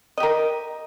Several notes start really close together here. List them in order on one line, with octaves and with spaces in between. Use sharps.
D#5 G4 A#4